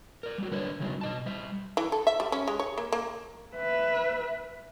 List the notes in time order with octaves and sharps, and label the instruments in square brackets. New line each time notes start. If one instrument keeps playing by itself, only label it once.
[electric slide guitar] A#4 D5
G3 F#4
D3 B4 C#5 D5
C#3 F#3 G3 B3 D4 D#4
B2 D#5 A5
G3 C5 E5
[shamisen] E3
A4
E5
G3
C#4
G#3
C#5
A#3
A#3
[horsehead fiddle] B4 E5